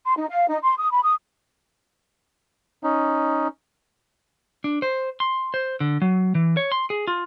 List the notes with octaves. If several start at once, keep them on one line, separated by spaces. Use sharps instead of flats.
C6
D#4
F5
D#4
C6
D#6
B5
D#6
C#4 D#4
D4
C5
C6
C5
D3
F#3
E3
C#5
C6
G#4
F4